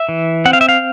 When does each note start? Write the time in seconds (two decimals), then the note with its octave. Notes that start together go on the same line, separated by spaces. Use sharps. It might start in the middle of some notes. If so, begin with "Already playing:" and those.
Already playing: E5
0.09 E3
0.45 C4 F#5
0.53 F5
0.61 E5
0.69 F5